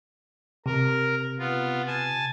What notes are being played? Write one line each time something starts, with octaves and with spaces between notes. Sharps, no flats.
C3 A#4
B3 F4
G#5 A5